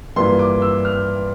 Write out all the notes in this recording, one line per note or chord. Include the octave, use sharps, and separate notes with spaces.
G2 E3 A#3 F4 C6
D6
E6
F6